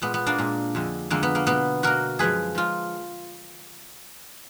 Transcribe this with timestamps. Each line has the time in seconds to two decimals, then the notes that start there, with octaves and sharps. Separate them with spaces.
0.02 A#2 G#3 B3
0.14 B3
0.26 A#3 D4
0.38 A#2 G#3
0.75 F2 D3 G#3
1.10 F2 D3 G#3 A#3
1.23 B3
1.35 A#3
1.47 B2 A#3 B3
1.83 B2 A#3 F#4 A#4
2.19 F#2 F3 G#3 G#4 B4
2.55 F3 G#3 F4